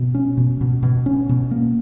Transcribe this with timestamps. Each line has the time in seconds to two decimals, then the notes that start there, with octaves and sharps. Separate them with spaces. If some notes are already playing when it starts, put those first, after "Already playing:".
Already playing: B2
0.15 C#4
0.37 B2
0.61 B2
0.83 B2
1.06 C#4
1.29 B2
1.51 A#3